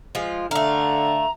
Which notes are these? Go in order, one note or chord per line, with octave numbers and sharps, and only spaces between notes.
F3 G#3 F4
D3 A3 F5 A#5